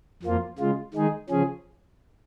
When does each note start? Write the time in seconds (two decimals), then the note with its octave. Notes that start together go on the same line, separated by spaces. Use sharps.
0.23 F2 F3 A#3 F4
0.58 C#3 G#3 F4
0.93 D#3 G#3 D#4 G#4
1.29 C#3 F3 C#4 G#4